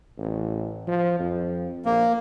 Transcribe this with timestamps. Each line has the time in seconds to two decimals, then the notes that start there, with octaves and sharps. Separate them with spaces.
0.19 A1
0.88 F3
1.19 F2
1.85 A#1 A#3